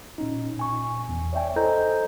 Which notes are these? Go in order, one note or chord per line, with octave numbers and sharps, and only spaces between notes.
A#2 C#4 D#4
A#2 G#5 C#6
E2
C#5 D5 E5 G5 G#5
E4 A4 C5 D#5 A#5 G6